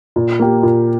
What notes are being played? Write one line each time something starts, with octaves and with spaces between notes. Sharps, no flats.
A#2
A#3 G4
A#2